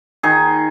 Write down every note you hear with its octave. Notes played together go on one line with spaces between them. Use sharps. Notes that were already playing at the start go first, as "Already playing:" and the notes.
D#3 G#4